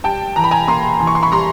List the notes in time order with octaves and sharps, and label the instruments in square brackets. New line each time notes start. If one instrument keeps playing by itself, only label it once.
[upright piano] G3 G5 A5
E3 A#5
B5
G#5 A#5
A#3 A#5 C6
E3
C#6
C6
B5 C#6
G3 A#5 C6